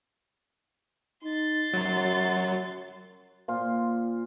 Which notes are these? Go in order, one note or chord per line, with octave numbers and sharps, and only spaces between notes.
D#4 C6 A6
F#2 F#3
A#2 F4 C5